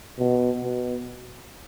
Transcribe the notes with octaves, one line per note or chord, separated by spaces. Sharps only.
B2
B2